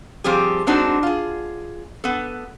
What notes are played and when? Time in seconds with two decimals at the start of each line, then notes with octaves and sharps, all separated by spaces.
0.24 F3 G3 C4 G4 G#4
0.67 G#3 C4 D4 D#4 F#4
1.03 F4 G#4
2.04 B3 A4